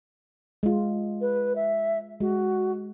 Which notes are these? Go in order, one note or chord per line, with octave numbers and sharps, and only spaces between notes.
G#3 F4
B4
E5
G#3 F#4